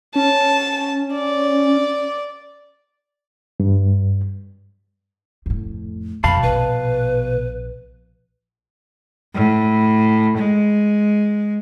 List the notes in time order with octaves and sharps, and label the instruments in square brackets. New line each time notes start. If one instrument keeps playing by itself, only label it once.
[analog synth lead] C#4 [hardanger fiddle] A5
[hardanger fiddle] D5
[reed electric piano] G2
[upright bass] F2 A2
[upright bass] C2 F2 [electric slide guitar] B2 F5 A5 [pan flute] B5
[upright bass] A#1 [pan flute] B4
[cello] A2
G#3